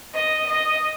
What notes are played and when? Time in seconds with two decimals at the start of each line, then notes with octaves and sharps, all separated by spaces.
0.13 D#5
0.47 D#5